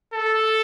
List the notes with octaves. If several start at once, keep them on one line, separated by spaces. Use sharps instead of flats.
A4